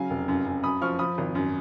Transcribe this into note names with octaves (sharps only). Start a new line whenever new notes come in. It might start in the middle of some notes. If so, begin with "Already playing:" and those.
Already playing: C#3 F#3 F5 G#5
F1
F#2
F#2
F#2 B5 D#6
F3 C#6 F6
F3 B5 D#6
G#1
F#2